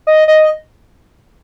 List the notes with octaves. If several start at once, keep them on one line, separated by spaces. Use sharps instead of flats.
D#5
D#5